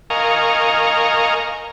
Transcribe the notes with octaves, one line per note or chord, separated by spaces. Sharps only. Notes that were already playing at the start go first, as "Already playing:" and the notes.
A#4 D#5 F5 G#5 A#5 C#6